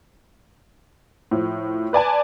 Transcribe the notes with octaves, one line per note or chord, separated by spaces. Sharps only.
A2 F3
B4 D5 G#5 A5